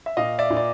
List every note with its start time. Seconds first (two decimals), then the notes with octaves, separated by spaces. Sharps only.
0.06 E5
0.17 A#2 D#5 F5
0.39 D5 E5
0.50 A#2
0.57 D5